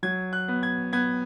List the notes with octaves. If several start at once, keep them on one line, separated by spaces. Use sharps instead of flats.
F#3 G#6
F#6
B3
G#6
B3 G#6